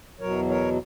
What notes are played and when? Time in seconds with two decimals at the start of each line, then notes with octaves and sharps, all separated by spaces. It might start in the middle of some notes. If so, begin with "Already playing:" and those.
0.20 E2 B2 F#3 A#4 C#5
0.49 A#4 C#5